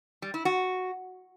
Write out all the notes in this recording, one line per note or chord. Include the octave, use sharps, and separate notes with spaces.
G3
E4
F#4